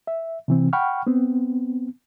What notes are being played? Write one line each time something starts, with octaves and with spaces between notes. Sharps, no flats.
E5
C3 E3 C4
F#5 G5 B5 C#6 F6
B3 C4